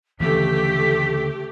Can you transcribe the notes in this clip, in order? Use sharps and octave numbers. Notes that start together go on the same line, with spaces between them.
D2 A2 C#3 E3 F3 A3 G4 B6